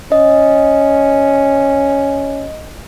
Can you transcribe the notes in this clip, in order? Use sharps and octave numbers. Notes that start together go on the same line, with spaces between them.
C#4 D#5